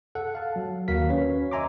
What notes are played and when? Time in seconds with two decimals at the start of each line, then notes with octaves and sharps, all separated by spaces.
0.15 A4 F#5
0.35 F5 A5
0.56 F#3
0.88 D#2 F#4 A#4 F5 B6
1.09 C#4 B4 C#5
1.52 D#5 E5 G#5 A#5 C6 D6